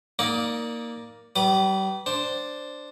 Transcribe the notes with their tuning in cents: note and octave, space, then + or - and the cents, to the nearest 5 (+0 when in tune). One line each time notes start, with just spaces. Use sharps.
A#3 +0 D#4 +20 D5 +0
G3 -35 B4 +0 D6 +40
D4 +0 C5 +0